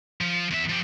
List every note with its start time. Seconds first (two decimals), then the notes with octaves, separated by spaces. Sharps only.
0.21 F3
0.51 E2 E5
0.69 F3 G4